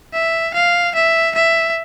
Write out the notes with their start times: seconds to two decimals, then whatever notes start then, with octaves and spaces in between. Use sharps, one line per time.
0.13 E5
0.54 F5
0.95 E5
1.35 E5